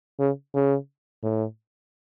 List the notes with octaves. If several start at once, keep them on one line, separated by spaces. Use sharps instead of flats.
C#3
C#3
A2